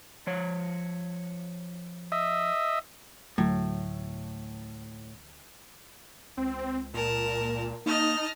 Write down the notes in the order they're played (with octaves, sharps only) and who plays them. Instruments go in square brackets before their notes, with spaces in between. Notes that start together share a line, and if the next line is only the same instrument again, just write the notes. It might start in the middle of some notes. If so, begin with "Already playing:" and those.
[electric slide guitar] F3 C#5
[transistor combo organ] D#5 E5
[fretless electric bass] D2 F#3 [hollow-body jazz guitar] A2
[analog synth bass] C#2 [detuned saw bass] C4
[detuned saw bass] A#2 [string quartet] A#4 A5
[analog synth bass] A#3 [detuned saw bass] D#4 [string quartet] D#5 A5 F6